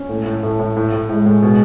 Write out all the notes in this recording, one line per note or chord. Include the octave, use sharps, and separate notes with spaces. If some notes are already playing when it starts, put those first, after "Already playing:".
Already playing: C#4
A2 A3
A2
A2
A2
A2
A2
A2 G#3
A2
B2